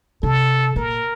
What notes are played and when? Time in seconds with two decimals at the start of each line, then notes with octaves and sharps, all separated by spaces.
0.23 C3 A4
0.76 A#2 A#4